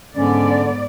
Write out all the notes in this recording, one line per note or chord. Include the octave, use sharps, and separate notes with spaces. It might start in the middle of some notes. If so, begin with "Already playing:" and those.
G#2 D3 B3 C#4 D5